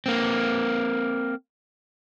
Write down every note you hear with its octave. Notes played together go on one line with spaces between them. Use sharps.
A#3 C4